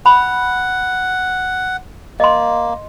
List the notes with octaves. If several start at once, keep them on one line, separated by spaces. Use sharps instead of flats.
F#5 B5
A#3 D#5 C6